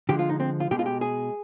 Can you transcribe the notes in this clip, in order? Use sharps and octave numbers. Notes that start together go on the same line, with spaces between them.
D3 F3 G#3 G4
F4
D#4
C4
F4
B2 G#3 G4
F4
G4
G#4